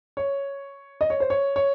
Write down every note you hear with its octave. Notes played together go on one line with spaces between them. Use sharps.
C#5
D#5
C#5
C5
C#5
C#5